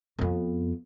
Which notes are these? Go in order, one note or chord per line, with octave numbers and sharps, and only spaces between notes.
F2 B3